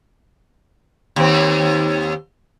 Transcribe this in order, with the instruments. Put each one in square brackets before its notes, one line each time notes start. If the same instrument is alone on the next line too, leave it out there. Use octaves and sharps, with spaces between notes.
[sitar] D#2 C4